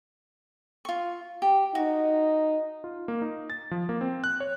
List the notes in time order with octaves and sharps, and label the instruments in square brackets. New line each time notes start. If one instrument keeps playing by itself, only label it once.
[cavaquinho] F4 C#6
G4
[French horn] D#4 [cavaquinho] F#4
[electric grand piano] F4
A#3
D#4
A6
F3
A#3
C4
F#6
C#5